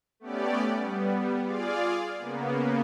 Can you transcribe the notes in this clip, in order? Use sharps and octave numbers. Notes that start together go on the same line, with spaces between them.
A3 B3 C#4 G4 D5
G3 B3
F4 G#4 D5 F5
C#3 A#3 B3